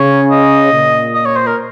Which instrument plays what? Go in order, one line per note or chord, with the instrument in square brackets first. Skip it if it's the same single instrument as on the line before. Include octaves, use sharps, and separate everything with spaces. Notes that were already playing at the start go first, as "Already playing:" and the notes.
Already playing: [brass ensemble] C#3 [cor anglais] C#5
[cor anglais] D#5
[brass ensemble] A#2
[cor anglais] D#5
C#5
C5
A#4